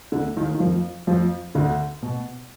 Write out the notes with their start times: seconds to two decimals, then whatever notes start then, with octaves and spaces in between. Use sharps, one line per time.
0.12 D2 D3
0.37 D#2 D#3
0.55 D#3
0.60 F2 F3
1.07 F2 F3
1.55 D2 D3
2.02 B2